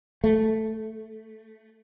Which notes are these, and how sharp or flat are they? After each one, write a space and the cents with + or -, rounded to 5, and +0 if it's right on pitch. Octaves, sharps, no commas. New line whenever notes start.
A3 +0